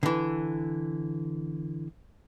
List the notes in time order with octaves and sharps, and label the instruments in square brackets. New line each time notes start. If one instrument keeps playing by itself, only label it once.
[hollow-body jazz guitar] D3 E3